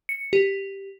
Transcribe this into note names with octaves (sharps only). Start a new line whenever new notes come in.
C#7
G4